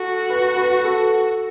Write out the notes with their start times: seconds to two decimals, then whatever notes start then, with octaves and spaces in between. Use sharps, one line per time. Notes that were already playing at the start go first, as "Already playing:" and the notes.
Already playing: F#4 A4
0.30 B4
0.57 B4
0.84 A4